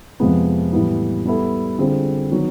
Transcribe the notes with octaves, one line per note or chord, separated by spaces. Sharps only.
F2 C3 F3 G#3 B3
A2 E3 G3 B3
G3 B3 E4 A4
D3 G3 C4 F4 G#4
D#3 F#3 B3